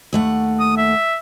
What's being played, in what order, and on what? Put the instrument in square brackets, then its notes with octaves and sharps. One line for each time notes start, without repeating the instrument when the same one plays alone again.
[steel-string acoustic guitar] D#2 A3 F#5
[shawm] D#6
E5